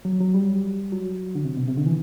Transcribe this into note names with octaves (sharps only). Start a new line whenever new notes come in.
F#3
F#3
G3
F#3
D3
C3
B2
C3
D3
E3